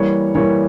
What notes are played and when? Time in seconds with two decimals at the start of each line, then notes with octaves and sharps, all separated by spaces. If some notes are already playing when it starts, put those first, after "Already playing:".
Already playing: E3 G3 A#3 C#5
0.35 E3 G3 A#3 C#5